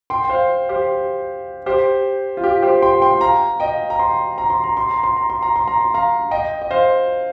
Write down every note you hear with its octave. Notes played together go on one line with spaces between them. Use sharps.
G5 C6
G5
C5 F5
G4 C5
G4 C5
F4
G4
G4 C5
G5 C6
G5 C6
F5 A#5
D#5 G5
A#5
G5 C6
A#5
C6
A#5
C6
A#5
C6
A#5
C6
A#5
C6
A#5
C6
F5 A#5
D#5 G5
D#5
C5 F5